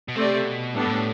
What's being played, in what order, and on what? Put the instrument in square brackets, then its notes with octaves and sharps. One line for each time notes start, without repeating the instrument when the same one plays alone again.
[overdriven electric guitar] B2
[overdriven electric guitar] C3 [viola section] A3 C4 G4 D5
[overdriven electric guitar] B2
[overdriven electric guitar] A2 [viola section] G3 B3 D4 A4
[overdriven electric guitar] G2
A2